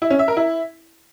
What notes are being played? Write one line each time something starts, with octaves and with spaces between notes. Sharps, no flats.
E4
C#4
E5
A#4
E4